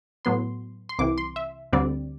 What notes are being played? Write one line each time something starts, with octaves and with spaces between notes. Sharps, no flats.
A2 F#3 B3 C6
C6
C2 C3 E3 D6
C6
E5
D2 D3 G3 C4 D5